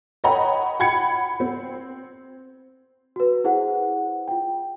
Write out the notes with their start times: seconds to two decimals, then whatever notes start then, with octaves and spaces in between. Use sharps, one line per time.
0.24 C#5 D#5 F#5 G5 A#5 B5
0.80 F#5 G5 B5 G#6 C#7
1.40 C4
3.16 F#4 B4
3.44 E4 G#4 C5 F#5
4.28 F4 G5